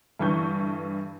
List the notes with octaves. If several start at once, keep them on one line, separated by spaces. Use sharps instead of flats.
G2 D3 E3 E4 C#6 G6